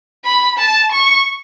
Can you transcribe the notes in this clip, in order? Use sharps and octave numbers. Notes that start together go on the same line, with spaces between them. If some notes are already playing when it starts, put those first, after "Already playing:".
B5
A5
C#6